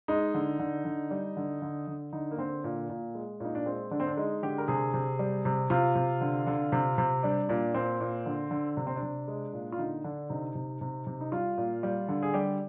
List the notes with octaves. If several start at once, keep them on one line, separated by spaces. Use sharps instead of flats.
G#3 D#4
D3
D3
D3
G3
D3
D3
D3
D3 D#4
A#3
D3 C4
A#2
A#2
G#3
A#2 D#4
D4
G#3 C4
D3 D4
C4
D4
G#3 D#4
D3 G4
A#4
C3 G#4
C3
G3
C3
C3 F4
C3
D3
D3
C3
C3
G3 D4
A#2 D4
A#2 C4
A#2
D3
D3
C3 D4
C4
D4
C3
G#3
A#2
F4
D3 D#4
D3 D4
C3 D#4
C3
C3
C3
D#4
G3 F4
A#2
G3
D3
G#4
G3 G4